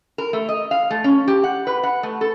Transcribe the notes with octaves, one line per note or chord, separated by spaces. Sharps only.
A#4
A3
D#5
F5
A3
C#4
G4
F#5
B4
F#5
A3
A4